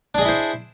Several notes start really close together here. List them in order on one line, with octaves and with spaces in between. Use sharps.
D4 G#4 D#5 E4 C5